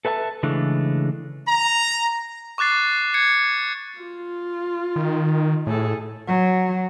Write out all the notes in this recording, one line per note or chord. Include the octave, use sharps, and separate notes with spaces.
A4 B4 E5 G#5 A5
C#3 E3 G#3 A3 D4
A#5
C#6 D6 F#6 A6 C7
G#6 C#7
F4
D#3
A2 G#4 A4
F#3